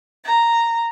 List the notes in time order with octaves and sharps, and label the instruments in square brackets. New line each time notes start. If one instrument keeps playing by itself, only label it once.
[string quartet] A#5